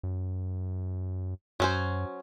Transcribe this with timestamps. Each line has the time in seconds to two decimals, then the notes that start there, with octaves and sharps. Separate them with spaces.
0.03 F#2
1.60 F#2 F#3 C#4 C5